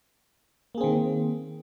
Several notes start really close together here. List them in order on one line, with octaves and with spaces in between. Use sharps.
A#3 G#4 C4 D#3